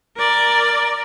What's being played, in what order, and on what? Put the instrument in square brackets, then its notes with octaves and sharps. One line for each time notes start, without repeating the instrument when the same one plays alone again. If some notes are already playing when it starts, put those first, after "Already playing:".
[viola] A#4 D5